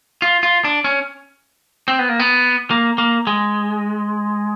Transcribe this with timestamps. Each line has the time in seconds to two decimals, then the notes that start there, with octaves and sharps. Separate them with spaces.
0.22 F4
0.43 F4
0.64 D4
0.84 C#4
1.88 C4
1.99 B3
2.09 A#3
2.19 B3
2.71 A#3
2.98 A#3
3.27 G#3